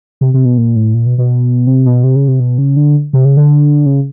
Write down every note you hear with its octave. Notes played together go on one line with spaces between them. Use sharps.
C3
C3
B2
A#2
A2
A#2
B2
B2
C3
B2
C3
C#3
C3
B2
C#3
D3
C3
C#3
D3
C#3